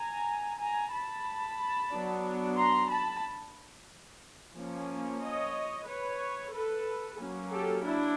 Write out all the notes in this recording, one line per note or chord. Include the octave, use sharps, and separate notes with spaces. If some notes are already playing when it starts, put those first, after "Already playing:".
Already playing: G#5 A#5
G#5 A#5
A5 B5
F#3 B3 D4
A#5 C6
A5 B5
F3 A#3 C#4
C#5 D#5
B4 C#5
A4 B4
F#3 A#3 C#4
G4 A4
D4 E4